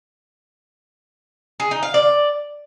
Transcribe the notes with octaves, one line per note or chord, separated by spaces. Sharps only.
G#4
D#4
F5
D5